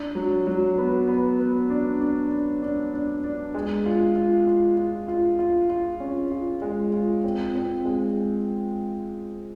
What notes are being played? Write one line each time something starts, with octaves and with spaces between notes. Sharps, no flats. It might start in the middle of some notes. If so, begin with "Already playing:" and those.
Already playing: D4
F#3
F#3
B3
B3
B3
D4
D4
D4
D4
D4
D4
G#3
F4
F4
F4
F4
F4
F4
F4
C#4
F4
G#3
F4
C4
C4
G#3